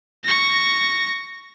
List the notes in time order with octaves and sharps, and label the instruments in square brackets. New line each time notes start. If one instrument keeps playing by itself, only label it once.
[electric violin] C#6 A#6